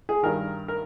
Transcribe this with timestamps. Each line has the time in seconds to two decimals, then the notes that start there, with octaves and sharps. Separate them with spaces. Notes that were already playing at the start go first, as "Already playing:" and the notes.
0.09 G#4
0.23 G2 D#3 A#4
0.68 A#4